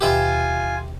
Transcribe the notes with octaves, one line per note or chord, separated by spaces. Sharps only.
D#2 B2 D#3 F4 G4 E5 G#5 B5